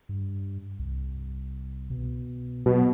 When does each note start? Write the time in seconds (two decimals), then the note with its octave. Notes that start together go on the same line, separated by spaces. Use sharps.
0.09 G2
0.79 C2
1.90 B2
2.66 B2 F#3